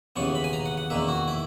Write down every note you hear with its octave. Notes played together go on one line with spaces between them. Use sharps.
D#2 C#3 E3 B3 C#6
B5
G#5
A#5
F#5
F#5
E2 D#3 A#3 E5
F#4
E4